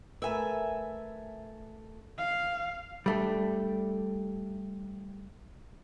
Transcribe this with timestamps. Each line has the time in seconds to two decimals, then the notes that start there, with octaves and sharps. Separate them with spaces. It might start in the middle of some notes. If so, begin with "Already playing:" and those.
0.22 A3 A#4 B4 E5 G#5
2.18 F5
3.06 G3 A3 D4